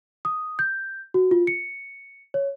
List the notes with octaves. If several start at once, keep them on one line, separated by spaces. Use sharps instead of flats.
D#6
G6
F#4
F4
C#7
C#5